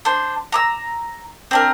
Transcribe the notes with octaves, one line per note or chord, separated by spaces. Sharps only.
D4 C5
A#5 D6 E6
C4 D4 A#4